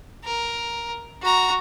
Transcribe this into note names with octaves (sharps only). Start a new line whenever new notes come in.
A#4
F#4 A#5